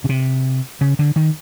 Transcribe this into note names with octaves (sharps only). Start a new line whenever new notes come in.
C#3
C3
C#3
D3
D#3